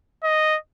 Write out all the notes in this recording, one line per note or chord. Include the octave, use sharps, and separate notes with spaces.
D#5